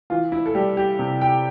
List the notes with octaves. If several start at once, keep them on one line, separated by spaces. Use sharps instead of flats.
E3 F4
E4
A4
G3 G4
G4
C3
G5